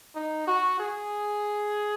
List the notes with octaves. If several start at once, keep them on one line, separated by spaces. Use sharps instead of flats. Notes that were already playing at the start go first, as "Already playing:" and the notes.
D#4
F#4
G#4